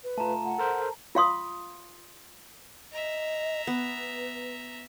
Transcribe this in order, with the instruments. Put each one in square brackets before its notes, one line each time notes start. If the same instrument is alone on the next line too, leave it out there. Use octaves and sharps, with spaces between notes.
[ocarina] B4
[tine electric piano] A3 F4 [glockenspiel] A5 A#5
[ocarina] F#5
[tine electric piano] A4 A#4 C5
[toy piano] F4 F5 C6 D#6
[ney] D#5 [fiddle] E5 A#5
[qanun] B3 [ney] B4